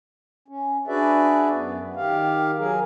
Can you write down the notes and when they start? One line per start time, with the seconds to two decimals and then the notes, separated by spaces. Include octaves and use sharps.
0.48 C#4
0.88 D4 F#4 G#4 B4 D5 E5
1.51 F#2 B3
1.96 D#3 G4 F5
2.58 F#3 G#4 A#4